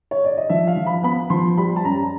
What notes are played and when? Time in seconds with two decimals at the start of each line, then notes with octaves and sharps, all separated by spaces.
0.11 C#5
0.25 D5
0.37 D#5
0.49 F3 E5
0.67 F5
0.77 F3
0.86 B5
1.03 B3 B5
1.30 F3 C6
1.58 G3 B5
1.76 A5
1.85 F#2 A#5